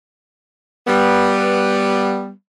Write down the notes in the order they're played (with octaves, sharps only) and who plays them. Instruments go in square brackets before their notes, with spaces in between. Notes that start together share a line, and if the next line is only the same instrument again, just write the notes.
[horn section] G3 B3